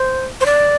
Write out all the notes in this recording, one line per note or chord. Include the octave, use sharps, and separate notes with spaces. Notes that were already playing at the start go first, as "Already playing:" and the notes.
Already playing: C5
C5
D5